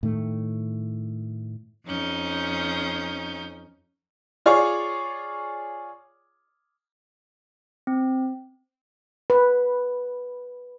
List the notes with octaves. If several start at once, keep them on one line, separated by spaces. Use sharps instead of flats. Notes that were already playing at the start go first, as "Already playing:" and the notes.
A2 D#3 A3
F2 C#4 D#4 G6
F4 G#4 C#5 D5 C#6
C4
B4